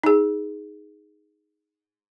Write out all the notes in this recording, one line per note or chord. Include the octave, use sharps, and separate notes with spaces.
D#4 G#4